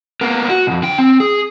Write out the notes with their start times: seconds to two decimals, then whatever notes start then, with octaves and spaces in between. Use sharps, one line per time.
0.21 A#3 B3
0.50 F#4
0.67 C2 F2
0.83 D3 G5
0.99 C4
1.20 G#4